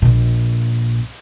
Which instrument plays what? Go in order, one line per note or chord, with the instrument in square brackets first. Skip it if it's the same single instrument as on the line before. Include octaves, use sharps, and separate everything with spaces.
[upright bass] A#1 A#2